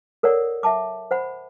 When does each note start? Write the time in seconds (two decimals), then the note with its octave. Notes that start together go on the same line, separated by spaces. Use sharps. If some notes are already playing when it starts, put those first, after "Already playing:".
0.23 A4 A#4 C#5 D5 F#5
0.63 E5 F#5 A5 D6
1.11 C5 F#5 B5